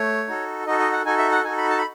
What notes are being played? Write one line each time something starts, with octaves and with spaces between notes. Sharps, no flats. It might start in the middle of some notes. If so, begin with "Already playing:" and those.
Already playing: A3 C#5
D#4 F#4 A4
D#4 F#4 A4 D#5
D#5
F#5
D#4 F#4 A4 G#5
E5
F#5
D#4 F#4 A4 G#5
B5
A5
B5